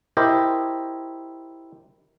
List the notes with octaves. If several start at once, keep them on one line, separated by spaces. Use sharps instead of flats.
E4 G4 A#4 C5 D#5